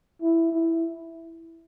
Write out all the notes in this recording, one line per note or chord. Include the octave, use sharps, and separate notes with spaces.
E4
E4